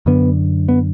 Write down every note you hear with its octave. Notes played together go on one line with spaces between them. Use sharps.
F#2 D3 B3
B3